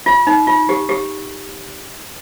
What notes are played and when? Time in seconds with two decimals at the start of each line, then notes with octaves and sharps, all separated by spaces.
0.06 F4
0.27 D#4
0.47 F4
0.69 G4
0.89 G4